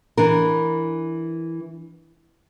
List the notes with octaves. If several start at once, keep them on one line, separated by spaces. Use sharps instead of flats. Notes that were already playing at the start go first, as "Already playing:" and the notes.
E3 D4 A#4